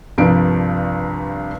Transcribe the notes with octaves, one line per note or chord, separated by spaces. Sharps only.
C2 G2 F3 B4 F5 D7